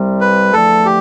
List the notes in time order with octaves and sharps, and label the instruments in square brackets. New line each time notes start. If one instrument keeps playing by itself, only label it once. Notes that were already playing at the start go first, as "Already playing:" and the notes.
Already playing: [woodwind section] C2 C3 G3
[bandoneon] B4
[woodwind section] E2 D3 F3 A3 [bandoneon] A4
[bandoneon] G4